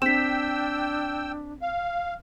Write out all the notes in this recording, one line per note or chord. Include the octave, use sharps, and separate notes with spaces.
C4 D4 G5 E6 B6 E7
F5